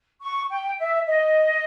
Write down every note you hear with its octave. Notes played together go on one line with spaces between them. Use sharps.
C#6
G5
E5
D#5